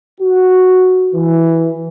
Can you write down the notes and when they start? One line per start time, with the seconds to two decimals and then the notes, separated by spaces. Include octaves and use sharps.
0.20 F#4
1.13 E3